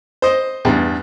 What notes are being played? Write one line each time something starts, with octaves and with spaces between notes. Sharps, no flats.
C5 D#5
E2 G2